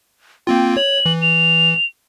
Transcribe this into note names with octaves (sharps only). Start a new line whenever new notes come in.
A#3 C4 F4 G5
C#5 F#7
E3
F7